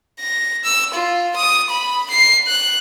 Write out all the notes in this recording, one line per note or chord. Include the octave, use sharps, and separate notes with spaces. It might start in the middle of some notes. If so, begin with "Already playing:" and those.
A#6
E6
F4
D#6
B5
C7
F#6